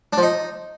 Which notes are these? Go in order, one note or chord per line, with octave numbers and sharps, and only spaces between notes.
D4
F3
D#4